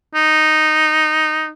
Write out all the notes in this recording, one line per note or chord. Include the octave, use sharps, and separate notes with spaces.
D#4